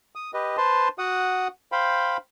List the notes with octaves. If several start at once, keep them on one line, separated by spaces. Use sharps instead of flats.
D#6
G4 B4 D#5
B4 C5 A5 C6
F#4 F#5 D#6
C5 F5 G5 B5